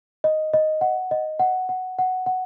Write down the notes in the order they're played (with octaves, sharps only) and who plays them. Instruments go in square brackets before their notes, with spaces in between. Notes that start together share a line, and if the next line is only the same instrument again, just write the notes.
[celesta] D#5
D#5
F#5
D#5
F#5
F#5
F#5
F#5